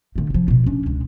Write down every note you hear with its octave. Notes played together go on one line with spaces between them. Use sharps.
D3 A3
C3 F3
B2 F4
C#4 D4
C#2 G#3